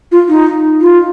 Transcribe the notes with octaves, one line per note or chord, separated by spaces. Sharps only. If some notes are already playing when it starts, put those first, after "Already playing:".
F4
D#4
F4